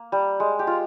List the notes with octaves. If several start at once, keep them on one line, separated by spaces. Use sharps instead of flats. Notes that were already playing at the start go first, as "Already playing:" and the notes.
Already playing: A#3
G3
G#3
G4
F4